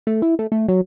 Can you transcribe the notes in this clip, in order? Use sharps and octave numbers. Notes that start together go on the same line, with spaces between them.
A3
E4
A3
A3
F#3